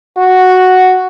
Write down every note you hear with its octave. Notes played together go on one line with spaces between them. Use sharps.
F#4